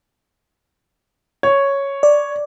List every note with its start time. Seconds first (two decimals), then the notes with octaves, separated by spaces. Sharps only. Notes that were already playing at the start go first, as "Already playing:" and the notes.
1.43 C#5
2.03 D5